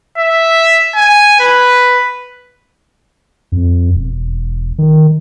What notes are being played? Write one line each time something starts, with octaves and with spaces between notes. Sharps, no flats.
E5
G#5
B4
F2
E1
D#3